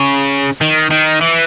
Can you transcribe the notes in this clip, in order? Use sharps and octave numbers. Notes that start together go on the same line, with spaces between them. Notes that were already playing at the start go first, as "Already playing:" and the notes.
Already playing: C#3
D#3
D#3
E3